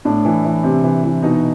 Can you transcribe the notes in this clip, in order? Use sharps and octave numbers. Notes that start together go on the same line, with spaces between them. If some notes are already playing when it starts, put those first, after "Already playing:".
A2 D4
E3
E3
C3
E3
E3
B2 D#4